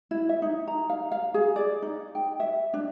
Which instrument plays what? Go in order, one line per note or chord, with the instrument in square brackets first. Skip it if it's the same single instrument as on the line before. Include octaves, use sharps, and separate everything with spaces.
[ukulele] E4
E5
D#4
A#5
F5
F5
G#4
D5
D#4
G5
E5
D4